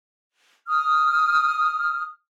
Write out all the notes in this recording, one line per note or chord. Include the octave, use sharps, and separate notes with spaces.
D#6 F6